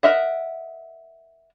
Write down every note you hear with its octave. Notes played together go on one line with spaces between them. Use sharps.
A#4 D#5 E5 F#5